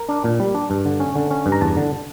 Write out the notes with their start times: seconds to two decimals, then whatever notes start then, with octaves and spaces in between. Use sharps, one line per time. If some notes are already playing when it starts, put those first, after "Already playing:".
Already playing: A#4
0.09 D4
0.24 A#2
0.40 G3
0.54 D4
0.70 G2
0.85 D3
1.00 C#4
1.15 D3
1.31 C#4
1.46 G2
1.52 A#5
1.61 E2 A5
1.77 D3